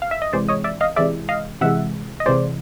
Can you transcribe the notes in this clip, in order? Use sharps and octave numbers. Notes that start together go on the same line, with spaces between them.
F5
E5
D#5
C3 E3 G#3 C5 D5
C#5 D#5
D5 E5
D#5 F5
C3 E3 G#3 D5 E5
D#5 F5
C3 E3 G#3 E5 F#5
D#5
C3 E3 G#3 C5 D5